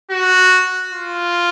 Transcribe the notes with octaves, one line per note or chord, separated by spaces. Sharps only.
F#4
F4